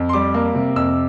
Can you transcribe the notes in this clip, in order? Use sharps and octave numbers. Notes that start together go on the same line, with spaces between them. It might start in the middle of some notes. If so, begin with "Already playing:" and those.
Already playing: F2
C6
G3 D6
A#3
C3
F2 E6